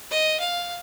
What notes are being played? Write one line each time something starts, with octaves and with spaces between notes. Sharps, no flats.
D#5
F5